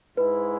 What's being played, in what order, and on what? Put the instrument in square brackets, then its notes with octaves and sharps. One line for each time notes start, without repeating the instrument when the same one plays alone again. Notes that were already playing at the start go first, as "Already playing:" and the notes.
[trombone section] G#2 G#3 E4 [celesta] B4